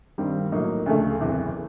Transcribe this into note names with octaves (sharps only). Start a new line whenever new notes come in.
G2 D#3 G3 C4
A2 F#3 A#3 D#4
D2 C#3 F3 A3
F#1 E2 C3 E3